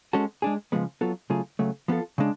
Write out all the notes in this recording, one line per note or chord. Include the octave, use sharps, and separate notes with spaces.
G#3 C#4 F#4 A4
G#3 D4 G#4
C#3 F3 G#3 B3
F#3 B3 F4 A4
C#3 F#3 A3 F4 G#4
C#3 F#3 A3
F3 B3 F4 A4
C#3 G#3 D4